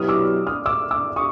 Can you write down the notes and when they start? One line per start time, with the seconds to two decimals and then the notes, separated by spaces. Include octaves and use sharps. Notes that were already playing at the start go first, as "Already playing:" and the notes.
Already playing: B2 F#3 B3 E4 G4 D#6 F6
0.09 D6 E6
0.47 D#6 F6
0.66 D6 E6
0.91 D6 E6
1.16 C#6 D#6